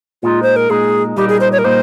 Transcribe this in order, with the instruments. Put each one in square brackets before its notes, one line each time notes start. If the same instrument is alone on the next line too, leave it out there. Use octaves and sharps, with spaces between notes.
[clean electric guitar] A#2 G#3 D#4 [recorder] F4
[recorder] C5
A#4
[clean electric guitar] A#2 G#3 D#4 [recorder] G#4
[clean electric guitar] A#2 G3 A#3 D#4 [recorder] G4
[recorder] G#4
C5
C#5
A#4
[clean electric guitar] A#2 G3 A#3 D#4 [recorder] C5